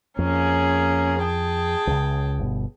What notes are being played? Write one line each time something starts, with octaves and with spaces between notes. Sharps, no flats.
F2 A#3 C#4 G#4
G#4 G5 A5
C#2 C#3
G1 B2